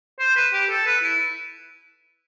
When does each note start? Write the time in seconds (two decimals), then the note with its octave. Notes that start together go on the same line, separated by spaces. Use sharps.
0.19 C5
0.36 B4
0.53 G4
0.70 A4
0.86 B4
1.03 E4